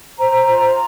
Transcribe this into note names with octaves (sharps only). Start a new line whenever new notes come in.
C5 A#5
F4